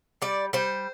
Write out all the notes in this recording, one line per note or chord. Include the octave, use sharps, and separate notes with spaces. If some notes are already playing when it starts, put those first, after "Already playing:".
G3 D5
G3 C5